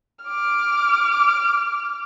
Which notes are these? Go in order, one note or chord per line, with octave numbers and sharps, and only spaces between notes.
D6 F6